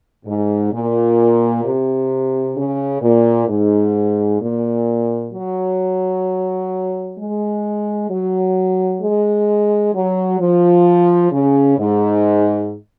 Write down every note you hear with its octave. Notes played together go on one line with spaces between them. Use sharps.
G#2
A#2
C3
C#3
A#2
G#2
A#2
F#3
G#3
F#3
G#3
F#3
F3
C#3
G#2